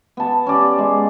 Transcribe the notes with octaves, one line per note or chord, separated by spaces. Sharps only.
B3 A5
C#4 G4 D5
G#3